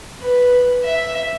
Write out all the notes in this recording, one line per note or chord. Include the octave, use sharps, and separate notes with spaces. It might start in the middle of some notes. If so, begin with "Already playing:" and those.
B4
E5